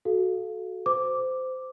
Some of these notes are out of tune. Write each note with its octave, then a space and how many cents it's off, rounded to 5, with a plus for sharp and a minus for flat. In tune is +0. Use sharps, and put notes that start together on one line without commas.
F#4 +0 A4 -20 F5 +0
C5 -20 D6 +0